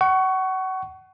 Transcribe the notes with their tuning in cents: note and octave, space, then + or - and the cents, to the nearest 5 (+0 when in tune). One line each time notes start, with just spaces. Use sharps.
F#5 +30 C#6 +10